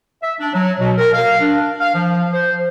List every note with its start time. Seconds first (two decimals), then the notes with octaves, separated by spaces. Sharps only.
0.23 E5
0.40 D4
0.54 F#3
0.80 B2
0.98 A#4
1.13 F5
1.40 D4
1.80 F5
1.95 F3
2.33 C5